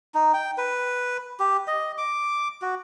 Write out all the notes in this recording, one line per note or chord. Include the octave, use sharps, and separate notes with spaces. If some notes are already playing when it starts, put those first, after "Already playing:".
D#4
G5
B4
G4
D#5
D6
F#4